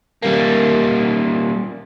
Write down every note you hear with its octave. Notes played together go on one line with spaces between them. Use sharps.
G3 A#3